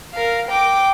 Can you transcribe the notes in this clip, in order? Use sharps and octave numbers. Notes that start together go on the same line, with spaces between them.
A#4 F5
G5 D6